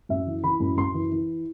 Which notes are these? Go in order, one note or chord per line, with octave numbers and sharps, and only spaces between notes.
F#2 E5
E3
E3 B5
F#2
F#2 C6
E3
E3